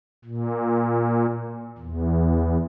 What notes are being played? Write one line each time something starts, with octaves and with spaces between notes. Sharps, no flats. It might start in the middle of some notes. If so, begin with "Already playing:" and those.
A#2
E2